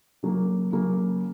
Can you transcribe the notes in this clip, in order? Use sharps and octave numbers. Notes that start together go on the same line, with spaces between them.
C#3 F#3 A#3
C#3 F#3 A#3